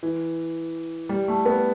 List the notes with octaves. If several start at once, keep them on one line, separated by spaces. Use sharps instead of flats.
E3
G3
A3
B3